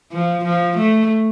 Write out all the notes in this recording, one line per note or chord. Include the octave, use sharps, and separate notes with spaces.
F3
F3
A3